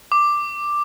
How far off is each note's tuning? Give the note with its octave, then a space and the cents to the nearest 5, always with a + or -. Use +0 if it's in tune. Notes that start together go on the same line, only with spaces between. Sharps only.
D6 +5